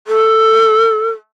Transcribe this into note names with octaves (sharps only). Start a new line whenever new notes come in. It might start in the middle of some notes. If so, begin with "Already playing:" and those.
A4